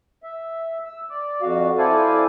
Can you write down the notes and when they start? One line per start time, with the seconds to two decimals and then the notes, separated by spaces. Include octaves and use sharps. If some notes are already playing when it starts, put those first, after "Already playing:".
0.23 E5
0.85 E6
1.09 D5
1.42 F2 F#4 F5
1.78 E4 A4 C5 D5 F5 G#5